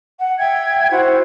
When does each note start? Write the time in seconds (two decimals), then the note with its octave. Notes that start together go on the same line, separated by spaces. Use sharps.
0.19 F#5
0.39 E5 G5 G#6
0.91 E4 F#4 C5